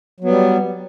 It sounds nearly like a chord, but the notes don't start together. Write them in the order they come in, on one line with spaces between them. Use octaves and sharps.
F#3 B3 G3